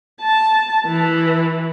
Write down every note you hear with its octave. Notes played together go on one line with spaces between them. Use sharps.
A5
E3